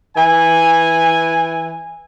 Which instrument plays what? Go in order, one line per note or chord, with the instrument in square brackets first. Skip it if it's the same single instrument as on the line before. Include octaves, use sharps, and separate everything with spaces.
[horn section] E3 E5 G#5